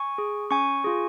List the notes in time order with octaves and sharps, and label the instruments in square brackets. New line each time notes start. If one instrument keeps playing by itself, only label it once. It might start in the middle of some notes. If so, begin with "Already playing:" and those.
Already playing: [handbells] G#5 C#6
G#4
C#4 G#5 C#6
F4 G#4